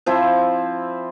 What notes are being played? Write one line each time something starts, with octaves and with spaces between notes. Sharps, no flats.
F3 C4 E4